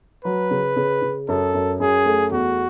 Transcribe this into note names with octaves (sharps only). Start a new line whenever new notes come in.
F#3 B4
C#3
C#3
C#3
F#2 A4
F#2
F#2 G#4
A3
E2 F#4